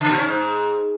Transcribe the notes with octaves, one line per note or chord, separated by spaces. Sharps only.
C#3
A#2
C#4
G#2